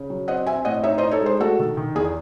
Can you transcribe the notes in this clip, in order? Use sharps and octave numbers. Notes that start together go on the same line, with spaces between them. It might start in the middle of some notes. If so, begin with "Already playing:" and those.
Already playing: C#3
F#3
C4 D#5 F#5
C4 E5 G#5
A2 D#5 F#5
D#4 C#5 E5
C5 D#5
D#4
A4 C#5
G#3
G#4 C5
A3 F#4 A4
D#3
D#3
E2 G#4